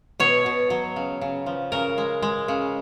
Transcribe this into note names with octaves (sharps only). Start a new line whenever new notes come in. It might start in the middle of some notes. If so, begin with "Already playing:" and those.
B2 C#5
B2
F#3
C#3
C#3
F3
C#3 A#4
G#3
G#3
C#3